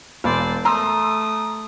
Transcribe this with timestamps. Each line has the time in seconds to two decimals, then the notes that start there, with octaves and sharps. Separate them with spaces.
0.24 E1 C5 D5
0.65 A3 A#5 C6 D#6 E6